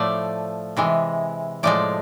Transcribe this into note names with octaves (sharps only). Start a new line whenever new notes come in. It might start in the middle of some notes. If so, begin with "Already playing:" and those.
Already playing: A2 F3 A3 D5
C3 E3 G#3
A2 F3 G#3 D5